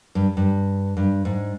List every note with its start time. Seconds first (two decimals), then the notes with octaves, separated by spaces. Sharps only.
0.15 G2
0.37 G2
0.97 G2
1.25 G#2